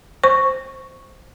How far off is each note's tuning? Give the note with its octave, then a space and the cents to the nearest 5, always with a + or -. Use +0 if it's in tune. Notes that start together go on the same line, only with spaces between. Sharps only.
C5 +0 C#6 -5